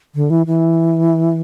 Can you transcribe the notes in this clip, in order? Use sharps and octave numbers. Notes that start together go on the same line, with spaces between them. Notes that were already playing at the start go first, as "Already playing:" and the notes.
D3
E3
E3